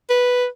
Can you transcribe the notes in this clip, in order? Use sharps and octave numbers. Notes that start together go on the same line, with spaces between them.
B4